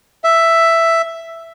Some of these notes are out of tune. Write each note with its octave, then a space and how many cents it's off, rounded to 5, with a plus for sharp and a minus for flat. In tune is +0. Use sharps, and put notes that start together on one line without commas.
E5 +5